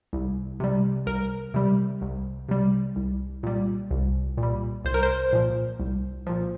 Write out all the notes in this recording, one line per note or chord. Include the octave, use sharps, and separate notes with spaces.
C2
C3 G3
C2 A#4
C3 G3
C2
C3 G3
C2
A#2 G3
C2
A#2
G3
C2 C5
A#4
C5
A#2 F3
C2
A#2 F3